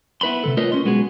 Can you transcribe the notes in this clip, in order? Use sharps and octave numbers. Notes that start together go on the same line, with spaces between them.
B3 E4 B4 B5 C6
C3 E3 A4
A3 F4 A#4 B4 C#5 D#5
C#4 C6
B1 G#3 B3 F#4 G#4